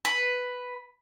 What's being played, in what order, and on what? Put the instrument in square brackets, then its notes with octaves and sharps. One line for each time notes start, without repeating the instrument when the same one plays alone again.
[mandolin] B4